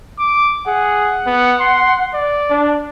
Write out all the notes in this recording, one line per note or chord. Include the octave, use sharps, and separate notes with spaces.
D6
G#4 F#5
B3
C6
D5
D4